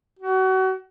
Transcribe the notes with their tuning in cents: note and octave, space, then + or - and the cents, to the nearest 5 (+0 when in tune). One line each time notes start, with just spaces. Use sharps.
F#4 +30